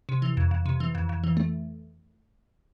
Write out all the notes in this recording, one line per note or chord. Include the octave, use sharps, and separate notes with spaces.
C3
E3
F2
F2
C3
E3
F2
F2
E3
A3